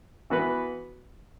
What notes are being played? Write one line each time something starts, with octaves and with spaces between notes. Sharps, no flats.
E3 B3 F#4 B4